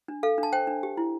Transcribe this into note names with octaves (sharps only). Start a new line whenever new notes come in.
D4
A4 F5
D4
A5
C5 G5
D4
G4
E4